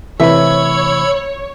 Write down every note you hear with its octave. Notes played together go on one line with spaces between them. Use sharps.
C3 E3 A3 C#5 E5 B5 E6